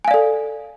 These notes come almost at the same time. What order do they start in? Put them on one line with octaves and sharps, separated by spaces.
G#5 F5 D5 A4